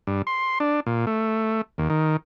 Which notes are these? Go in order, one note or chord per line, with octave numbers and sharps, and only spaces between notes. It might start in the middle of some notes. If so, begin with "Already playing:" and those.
G2
C6
D4
A#2
A3
D#2
D#3